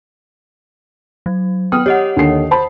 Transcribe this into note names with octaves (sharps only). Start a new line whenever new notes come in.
F#3
B3 G5 D#6 F6
G4 C#5 D#5 F#5
D#2 D3 C7
C5 A5 B5